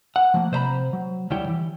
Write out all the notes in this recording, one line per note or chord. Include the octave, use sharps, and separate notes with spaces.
F#5
F3 A3 A#3
C3 C5 D5 A#5 B5
F#3
D2 G3 E4 C#5 G5
E3